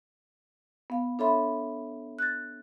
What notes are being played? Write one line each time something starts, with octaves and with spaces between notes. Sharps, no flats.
B3 F5
D4 A4 C#5 E5 B5 C6
F#6 A6